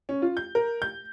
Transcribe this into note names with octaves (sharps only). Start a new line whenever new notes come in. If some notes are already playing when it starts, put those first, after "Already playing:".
C#4
F4
G6
A#4
G6